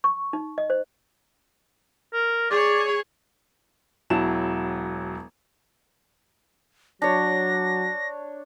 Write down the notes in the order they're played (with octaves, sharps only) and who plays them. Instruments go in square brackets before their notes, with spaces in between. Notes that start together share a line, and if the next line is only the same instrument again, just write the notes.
[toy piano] C#6
D#4
D#5
C5
[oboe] A#4
[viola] G#4 C#5 [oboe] D5
[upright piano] E1 F#3 E4 A5 E7
[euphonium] F#3 [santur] D4 C#5 [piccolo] A#6